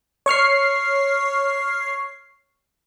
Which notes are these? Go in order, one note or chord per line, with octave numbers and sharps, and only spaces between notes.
C#5 C#6 F6 C7